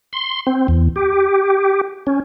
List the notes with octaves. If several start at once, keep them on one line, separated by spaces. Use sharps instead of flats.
C6
C4
E2
G4
C#4